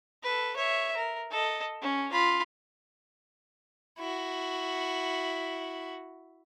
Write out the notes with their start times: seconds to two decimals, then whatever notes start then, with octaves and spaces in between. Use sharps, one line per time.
0.23 A4 B4
0.56 C#5 E5
0.97 A#4
1.31 A4 D#5
1.82 C#4
2.12 F4 B5
3.98 E4 F#4